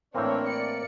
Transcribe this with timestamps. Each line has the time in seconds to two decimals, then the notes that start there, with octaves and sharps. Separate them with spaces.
0.15 A2 E3 A#3 C4 D4 C#5
0.48 D5 C#7